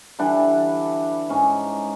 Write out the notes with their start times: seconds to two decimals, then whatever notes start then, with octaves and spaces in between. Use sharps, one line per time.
0.19 D3 E3 G3 D4
1.29 G#2 C#4 D#4